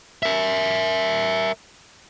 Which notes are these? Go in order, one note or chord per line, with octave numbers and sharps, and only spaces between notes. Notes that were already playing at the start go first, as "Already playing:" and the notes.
A#4 E5